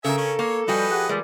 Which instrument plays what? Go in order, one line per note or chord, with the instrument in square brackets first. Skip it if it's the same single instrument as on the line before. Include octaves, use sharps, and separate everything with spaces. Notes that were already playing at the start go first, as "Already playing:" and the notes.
[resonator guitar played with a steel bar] C#3 A#4 [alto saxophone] A4 [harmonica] E5 G#5
[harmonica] C#4
[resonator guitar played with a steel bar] A#3 [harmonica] C#5
[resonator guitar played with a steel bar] F3 F#4 G#5 [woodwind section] G3 G5 [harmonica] B4 D#5
[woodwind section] G4 G#4 F#5
[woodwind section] A#2 E3 G3 [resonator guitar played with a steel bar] G#3